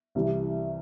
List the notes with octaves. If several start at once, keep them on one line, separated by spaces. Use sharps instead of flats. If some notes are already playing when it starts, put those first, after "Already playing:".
C2 C3 E3